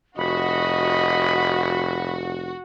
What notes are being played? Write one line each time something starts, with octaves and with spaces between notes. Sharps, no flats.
F1 F#4 D#5 B5